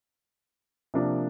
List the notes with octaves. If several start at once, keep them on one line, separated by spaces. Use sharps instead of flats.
C3 F3 A#3 D4